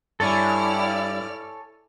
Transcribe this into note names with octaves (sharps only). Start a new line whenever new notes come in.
G2 E4 A4 C#5 D5 G#5 F6